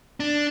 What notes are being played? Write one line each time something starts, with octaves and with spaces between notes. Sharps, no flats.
D4